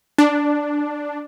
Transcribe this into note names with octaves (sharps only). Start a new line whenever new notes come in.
D4